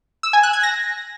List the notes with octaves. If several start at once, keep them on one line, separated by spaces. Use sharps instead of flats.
E6
G#5
F#6
G#6
A#6